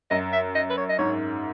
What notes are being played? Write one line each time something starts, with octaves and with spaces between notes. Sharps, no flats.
F#2 D#5
E5
D#5
B4
C#5
D#5
G#2 C#5